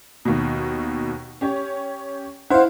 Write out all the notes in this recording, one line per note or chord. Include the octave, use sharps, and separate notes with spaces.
D#2 B2
C#4 G4 C#5
E4 C5 F5 F#5